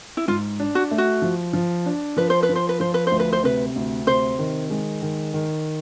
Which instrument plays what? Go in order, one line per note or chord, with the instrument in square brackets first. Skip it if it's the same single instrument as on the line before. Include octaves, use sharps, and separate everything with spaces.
[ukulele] E4
[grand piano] G#2 [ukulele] F4
[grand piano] D4
[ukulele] F#4
[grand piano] A3
[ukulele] F#4
[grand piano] F3
F3
D4
[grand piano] F3 [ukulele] B4
[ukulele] C5
B4
[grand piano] F3
[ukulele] C5
B4
[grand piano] F3 [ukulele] C5
[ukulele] B4
[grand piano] D2 [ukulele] C5
[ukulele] B4
C5
[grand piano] C3 [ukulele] B4
[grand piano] D2
[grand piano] C3 [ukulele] C5
[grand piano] D#3
G#3
D#3
D#3